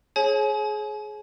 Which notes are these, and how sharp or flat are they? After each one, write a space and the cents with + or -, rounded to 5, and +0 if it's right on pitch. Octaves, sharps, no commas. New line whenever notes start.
G#4 +25 C#5 -30 G#5 +40